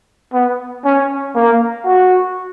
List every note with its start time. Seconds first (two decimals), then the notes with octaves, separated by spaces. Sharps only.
0.33 B3
0.85 C#4
1.35 A#3
1.85 F#4